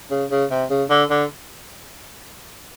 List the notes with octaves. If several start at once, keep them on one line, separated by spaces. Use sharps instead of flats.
C#3
C#3
C3
C#3
D3
D3